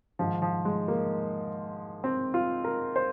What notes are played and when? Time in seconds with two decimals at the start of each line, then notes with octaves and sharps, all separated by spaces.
0.19 G#2 D#3 F3
0.42 F3
0.65 G#3
0.88 A#3
2.04 C4
2.34 F4
2.64 A#4
2.96 C5